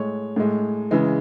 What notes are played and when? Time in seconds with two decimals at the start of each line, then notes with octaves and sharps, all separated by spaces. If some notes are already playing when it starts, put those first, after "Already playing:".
Already playing: A2 G#3 C#5
0.36 A2 G#3
0.91 C#3 E3 G#3